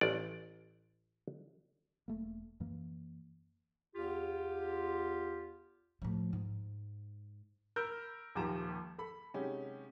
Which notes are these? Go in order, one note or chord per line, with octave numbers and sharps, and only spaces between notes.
A1 D5
E1 A3 A#3
F#2 E3 A#3
E2 F4 G4
A2 F3
G#2
A#4 B5 E6 F6 G6 A#6
D#1 D#2 F3 G4 A#5 E7
A4 B5
C3 F#3 G#3 C#4 D#4 G4